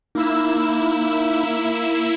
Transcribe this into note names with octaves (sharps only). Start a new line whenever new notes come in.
A#3 D#4 E4 E6